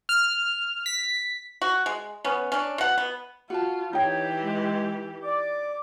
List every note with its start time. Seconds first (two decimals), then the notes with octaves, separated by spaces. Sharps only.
0.09 F6
0.86 B6
1.62 F#4
1.86 G#3
2.25 B3 C#4
2.52 C#4 D4
2.78 B2 F#5
2.98 B3
3.50 F4 F#4 A5
3.93 E3 D#4 G4 C#5 G5
4.41 G#3
5.24 D5 D6